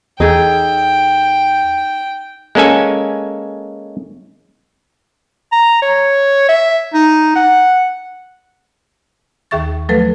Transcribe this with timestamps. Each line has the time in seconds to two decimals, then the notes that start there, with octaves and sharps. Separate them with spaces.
0.20 E2 D#4 G#4 A4 G5
2.55 G#3 A#3 C#4 A4 G#5
5.52 A#5
5.82 C#5
6.48 E5
6.94 D#4
7.36 F#5
9.51 D#2 D#3 G#4 E5 C#6 A6
9.89 F3 F#3 A3 A4 B4